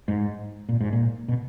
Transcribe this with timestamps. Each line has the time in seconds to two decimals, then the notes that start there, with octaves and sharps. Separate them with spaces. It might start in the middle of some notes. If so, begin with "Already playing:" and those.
0.08 G#2
0.69 A#2
0.81 G#2
0.93 A#2
1.28 B2